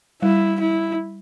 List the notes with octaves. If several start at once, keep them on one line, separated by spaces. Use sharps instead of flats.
G3 E4
E4